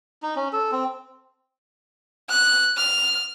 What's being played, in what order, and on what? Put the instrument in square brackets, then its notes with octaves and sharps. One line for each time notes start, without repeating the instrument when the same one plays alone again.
[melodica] D#4
C#4
A4
C4
[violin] F#6
F6